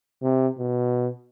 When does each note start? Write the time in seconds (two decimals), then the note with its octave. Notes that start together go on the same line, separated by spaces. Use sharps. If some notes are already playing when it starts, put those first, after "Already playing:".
0.23 C3
0.58 B2